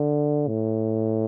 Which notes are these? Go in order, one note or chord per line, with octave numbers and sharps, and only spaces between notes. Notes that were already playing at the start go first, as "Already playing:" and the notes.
Already playing: D3
A2